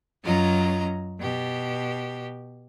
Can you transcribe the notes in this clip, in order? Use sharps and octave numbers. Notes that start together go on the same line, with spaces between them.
F#2 F#3 C#4 F4 D#5 A#5
B2 G4